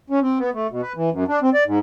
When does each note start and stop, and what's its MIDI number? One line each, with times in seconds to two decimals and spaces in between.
0.10 0.20 61
0.22 0.38 60
0.39 0.50 59
0.54 0.67 57
0.70 0.81 47
0.82 0.93 71
0.96 1.10 52
1.12 1.24 42
1.28 1.39 62
1.42 1.50 60
1.54 1.64 74
1.66 1.79 44